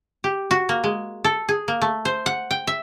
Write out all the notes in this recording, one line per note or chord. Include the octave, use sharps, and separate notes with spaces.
G4
F#4
A#3
G#3
A4
G#4
A#3
A3
C5
F#5
G5
E5